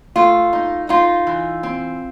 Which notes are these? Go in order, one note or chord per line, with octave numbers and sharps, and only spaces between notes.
A3 F4
D#4
D#4 F4
E3
C4